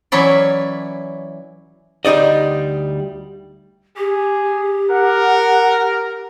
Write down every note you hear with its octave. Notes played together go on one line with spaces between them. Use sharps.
E3 F#3 C#4 E4 D5
D2 G3 D#4 D5 D#5
G4 G#4
A#4 F#5